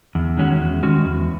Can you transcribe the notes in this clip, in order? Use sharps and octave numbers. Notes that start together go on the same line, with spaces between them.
E2
D#3 G#3 C#4 F#4
E2
D#3 G#3 C#4 F#4
E2